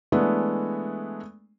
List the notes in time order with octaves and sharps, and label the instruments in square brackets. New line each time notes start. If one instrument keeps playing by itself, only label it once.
[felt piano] E3 G#3 A3 B3 D4